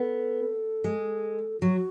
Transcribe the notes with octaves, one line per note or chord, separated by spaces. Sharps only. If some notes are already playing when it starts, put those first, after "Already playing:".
Already playing: B3 A4
G#3
F#3 F#4